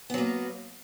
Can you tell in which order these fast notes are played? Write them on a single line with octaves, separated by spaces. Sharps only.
B3 F#3 A#3